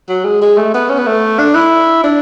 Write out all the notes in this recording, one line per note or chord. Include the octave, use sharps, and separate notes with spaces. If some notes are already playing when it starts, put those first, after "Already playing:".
F#3
G#3
G#3
A3
B3
C#4
B3
A3
D4
E4
D4